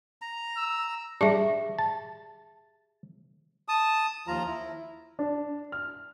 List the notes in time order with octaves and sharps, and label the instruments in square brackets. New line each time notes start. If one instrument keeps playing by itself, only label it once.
[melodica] A#5
[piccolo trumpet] E6
[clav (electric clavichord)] G3 D4 [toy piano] G4 G#4 E5
[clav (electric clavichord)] A5
[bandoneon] A5 D#6
D#2 F3 F4 A#5
E4
[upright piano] D4
F6